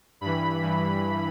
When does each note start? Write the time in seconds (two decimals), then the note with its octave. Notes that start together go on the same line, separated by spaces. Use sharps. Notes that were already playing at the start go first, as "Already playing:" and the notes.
0.21 G2 E3 B5
0.61 G2 E3